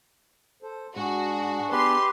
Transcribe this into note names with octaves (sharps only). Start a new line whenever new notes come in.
A4 C5
G#2 D4 F#4 G#4
B3 G4 B4 C6